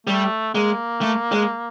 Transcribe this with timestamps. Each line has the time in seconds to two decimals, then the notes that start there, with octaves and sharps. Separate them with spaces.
0.07 G3 A3
0.54 G#3 A#3
1.01 A3
1.32 G#3